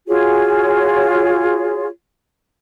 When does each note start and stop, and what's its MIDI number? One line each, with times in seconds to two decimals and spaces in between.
0.07 1.87 65
0.07 1.87 66
0.07 1.87 68
0.07 1.87 73